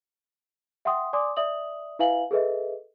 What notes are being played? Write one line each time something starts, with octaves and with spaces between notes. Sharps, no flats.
E5 F#5 G5 C6 D#6
D5 G#5 C6 D6 D#6
D5 E5 D#6 F#7
E4 B4 E5 F5 G#5 F#7
G#4 A4 B4 D#5 E5